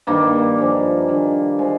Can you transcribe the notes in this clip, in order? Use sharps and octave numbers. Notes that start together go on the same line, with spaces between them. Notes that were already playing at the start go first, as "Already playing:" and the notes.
G2 D#3 G3 A#3
G2 F3 G#3
G2 D#3 G#3
F3 G#3